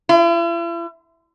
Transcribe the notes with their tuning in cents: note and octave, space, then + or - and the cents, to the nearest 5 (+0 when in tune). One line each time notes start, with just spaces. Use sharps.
E4 +45